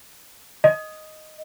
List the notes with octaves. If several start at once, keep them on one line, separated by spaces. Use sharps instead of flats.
D#5